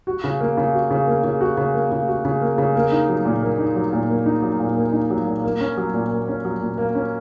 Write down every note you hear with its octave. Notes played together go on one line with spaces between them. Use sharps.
F#4
C#3
A#3
C#3
F#4
C#3
A#3
C#3
F#4
C#3
A#3
C#3
F#4
C#3
A#3
C#3
A#3
D#4
F#3
A#2
A#3
D#4
F#3
A#2
A#3
D#4
F#3
A#2
A#3
D#4
F#3
A#2
A#3
C#4
F#3
A#2
A#3
C#4
F#3
A#2
A#3
C#4